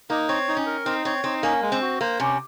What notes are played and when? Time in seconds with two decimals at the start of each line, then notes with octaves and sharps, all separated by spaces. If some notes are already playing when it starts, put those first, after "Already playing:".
0.10 A#3 D#4
0.28 C4 C#5
0.48 D#4
0.57 C#4
0.66 A#4
0.85 C4 D#4
1.05 C4 C#5
1.24 C4 D#4
1.43 A#3 C#4
1.62 G#3
1.72 C4
1.82 F#4
2.01 A#3 C5
2.20 C3 C#4